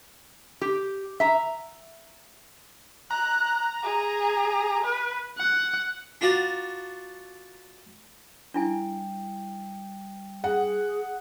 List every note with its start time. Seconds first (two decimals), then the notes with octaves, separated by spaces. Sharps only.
0.61 G4
1.20 E5 A#5
3.11 A#5 F#6
3.83 G#4
4.84 B4
5.38 F#5
6.21 D4 F4 F#4 D5 A#5
8.54 G3 D4 E4 G5 G#5
10.44 G#4 F#5